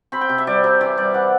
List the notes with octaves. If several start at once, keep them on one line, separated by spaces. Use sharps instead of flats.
C4 B5
G5
C3
E5
G3 D5
C3 C5
E3 D5
G3 D5
E3 F#5